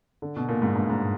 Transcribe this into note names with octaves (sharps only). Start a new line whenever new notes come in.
D3
B2
A#2
G#2
G2
G#2